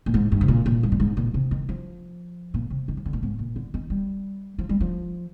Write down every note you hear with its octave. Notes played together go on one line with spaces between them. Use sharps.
A#2
G#2
G2
C3
A#2
A#2
G2
A#2
G#2
A#2
C3
D#3
F3
A#2
C3
D#3
F3
D3
A#2
G#2
A#2
D3
D#3
G3
F3
G3
F3